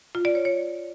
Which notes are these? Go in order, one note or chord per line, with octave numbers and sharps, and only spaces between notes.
F4
D5
C#5
C#5